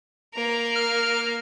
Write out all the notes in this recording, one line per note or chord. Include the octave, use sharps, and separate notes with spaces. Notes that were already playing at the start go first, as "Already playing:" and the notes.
A#3 A#4
F6